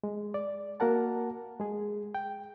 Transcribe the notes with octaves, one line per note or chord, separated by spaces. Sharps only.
G#3
D5
A#3 F#4 A#4 F#5 A5
G#3 G#4
G5